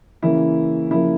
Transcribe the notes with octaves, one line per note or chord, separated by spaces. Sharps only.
C#3 E3 A#3 E4
C#3 F3 A#3 E4